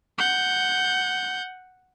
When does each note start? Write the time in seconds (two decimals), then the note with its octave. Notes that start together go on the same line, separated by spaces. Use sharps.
0.18 F#5 G6